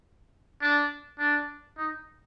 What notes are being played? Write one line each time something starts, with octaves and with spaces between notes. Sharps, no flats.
D4
D4
D#4